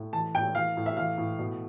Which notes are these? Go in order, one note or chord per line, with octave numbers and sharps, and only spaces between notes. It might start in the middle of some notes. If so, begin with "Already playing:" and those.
Already playing: A2
E3 A5
A2 G5
E3 F5
A2
E5
E3 F5
A2
B2